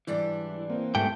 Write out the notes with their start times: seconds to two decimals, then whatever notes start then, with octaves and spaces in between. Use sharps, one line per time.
0.07 G#2 E3 G3 D4
0.70 A#3 C4
0.95 G#2 G3 A3 B3 A#4 G5